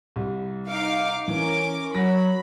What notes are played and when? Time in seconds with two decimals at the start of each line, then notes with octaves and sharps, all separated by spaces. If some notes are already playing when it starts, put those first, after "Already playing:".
0.16 C2 G3
0.67 D#4 F5 D6
1.28 E3 C#4 A#4 D6
1.95 F#3 B5 A#6